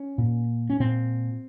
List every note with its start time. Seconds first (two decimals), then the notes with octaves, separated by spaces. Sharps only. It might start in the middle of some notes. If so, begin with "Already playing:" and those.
Already playing: C#4
0.18 A#2
0.70 C#4
0.80 A#2 C4